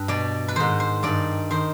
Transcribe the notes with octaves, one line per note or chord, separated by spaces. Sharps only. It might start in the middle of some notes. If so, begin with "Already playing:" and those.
Already playing: G2 B4
B2 D5
B4
G#2 D#3 C5
C5
G2 D#3 D5
D#3 C5